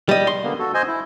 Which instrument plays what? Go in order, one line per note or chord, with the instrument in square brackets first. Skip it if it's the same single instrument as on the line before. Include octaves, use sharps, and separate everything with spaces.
[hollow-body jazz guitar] G3 D#5
C6
[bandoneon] D3 A#3 B3
F#4 A4
C5 D#5 G#5
E4